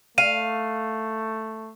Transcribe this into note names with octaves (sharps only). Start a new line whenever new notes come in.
A3 F5 D#7